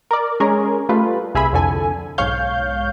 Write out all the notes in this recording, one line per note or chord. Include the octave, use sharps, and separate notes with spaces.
A#4 D5
G#3 C#4 G#4 A#4
G3 A3 F4 B4
C2 G#4 E5 G#5 B5
C2 F2 D3 A4 G#5
B1 G#2 C#5 F5 G6